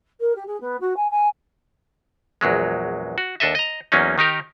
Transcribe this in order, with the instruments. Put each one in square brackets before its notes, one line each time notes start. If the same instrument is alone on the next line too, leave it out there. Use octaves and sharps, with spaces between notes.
[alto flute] A#4
G4
G#4
B3
F#4
G#5
G#5
[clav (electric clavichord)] A#1 E2 F#3 G#3
F#4
D#2 D4 A4 D#5 E5
D#5 A#5
E2 F#3 A#3 C#4 D#4
D#3 D#4 G4 A#4